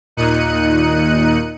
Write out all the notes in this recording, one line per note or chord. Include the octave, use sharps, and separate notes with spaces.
D#2 A#2 D#4 F#6 C#7 D#7